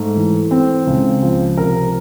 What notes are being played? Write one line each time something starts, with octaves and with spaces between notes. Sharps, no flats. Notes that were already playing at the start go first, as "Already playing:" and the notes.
Already playing: G#2 A3
E3
C4
C#2
F3
C3 A#4